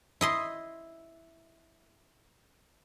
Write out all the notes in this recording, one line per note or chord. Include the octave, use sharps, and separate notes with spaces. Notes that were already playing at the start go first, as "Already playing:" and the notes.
E4 D#5 C6